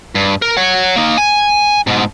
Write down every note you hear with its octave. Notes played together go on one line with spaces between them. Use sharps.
G2
A#4
C#5 F#5
A#3 D#4
G#5
G#2 B2